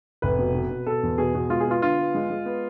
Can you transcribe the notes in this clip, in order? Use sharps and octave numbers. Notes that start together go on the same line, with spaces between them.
F1 B4
B2
B2
B2
B2 A4
E2
B2 G#4
B2
G#3 F4
G#4
B3 F4
D3 F4
B3
G#3
G#3
B3